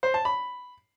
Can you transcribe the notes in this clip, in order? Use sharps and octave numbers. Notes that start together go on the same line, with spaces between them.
C5
A5
B5